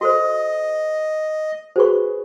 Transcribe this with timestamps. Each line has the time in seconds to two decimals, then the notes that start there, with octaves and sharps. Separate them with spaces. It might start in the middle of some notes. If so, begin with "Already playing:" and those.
0.01 F#4 A4 C5 D#5
1.76 F#4 G#4 B4 C5 C#6